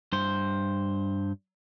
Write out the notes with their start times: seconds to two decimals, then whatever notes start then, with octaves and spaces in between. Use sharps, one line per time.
0.13 G2 C5